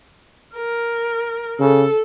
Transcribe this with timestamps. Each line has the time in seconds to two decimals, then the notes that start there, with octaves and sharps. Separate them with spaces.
0.56 A#4
1.60 C#3 A4